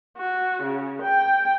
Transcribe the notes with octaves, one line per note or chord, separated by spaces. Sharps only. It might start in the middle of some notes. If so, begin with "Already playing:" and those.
F#4
C#3
G5